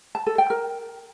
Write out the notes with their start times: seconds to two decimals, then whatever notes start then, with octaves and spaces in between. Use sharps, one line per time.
0.15 A5
0.27 A4
0.38 G5
0.50 A#4